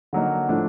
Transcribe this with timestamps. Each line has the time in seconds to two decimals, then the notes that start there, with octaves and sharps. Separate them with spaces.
0.13 D3 F#3 A#3 D#4
0.49 A2 F3 A3 D4